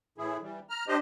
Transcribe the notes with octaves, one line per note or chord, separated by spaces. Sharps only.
A2 E3 E4 G#4
E3 G3
A#5 F6
D4 G4 C5 D#5